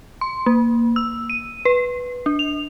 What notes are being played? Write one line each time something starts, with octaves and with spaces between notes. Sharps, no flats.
C6
A#3
E6
D#7
B4
D4
F7